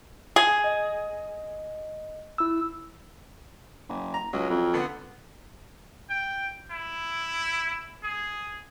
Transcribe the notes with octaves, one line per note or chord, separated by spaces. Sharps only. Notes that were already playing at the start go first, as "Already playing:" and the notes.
G#4
D#5
E4 E6
F#1
A#5
C#2 F#3
F2
D3 B3
G5
E4
G#4